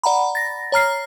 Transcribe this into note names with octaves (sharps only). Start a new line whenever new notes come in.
D5 F#5 A#5 B5
A6 A#6
C#5 A#5 F6 C7